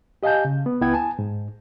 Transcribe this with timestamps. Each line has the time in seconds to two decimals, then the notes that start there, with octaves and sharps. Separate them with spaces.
0.23 G4 D#5 F5 G#5 A5 G6
0.45 C#3
0.66 B3
0.81 C#2 B3 E4 B4 G5 G#6
0.94 G#5 A5
1.19 G#2